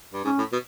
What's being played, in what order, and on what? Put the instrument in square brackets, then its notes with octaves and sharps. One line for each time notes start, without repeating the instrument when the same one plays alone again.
[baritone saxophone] G2
[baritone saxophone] G#2 [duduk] C#4
[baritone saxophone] A2
B2